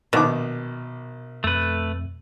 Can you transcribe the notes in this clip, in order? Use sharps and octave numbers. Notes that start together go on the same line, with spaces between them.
A#1 B2 D#3 D6
F2 A3 B4